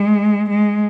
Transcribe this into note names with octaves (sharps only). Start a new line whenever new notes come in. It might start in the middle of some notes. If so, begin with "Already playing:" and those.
Already playing: G#3
G#3